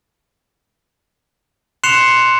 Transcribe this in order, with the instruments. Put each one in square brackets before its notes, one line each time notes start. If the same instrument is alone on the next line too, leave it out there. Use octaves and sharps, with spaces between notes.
[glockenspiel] C6 F#6 C7 C#7 E7 F7